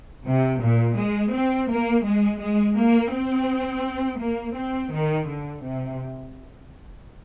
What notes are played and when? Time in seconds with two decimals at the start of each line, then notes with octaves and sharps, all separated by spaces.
0.25 C3
0.61 A#2
0.97 G#3
1.32 C4
1.69 A#3
2.05 G#3
2.41 G#3
2.77 A#3
3.13 C4
4.19 A#3
4.55 C4
4.91 D#3
5.28 D3
5.64 C3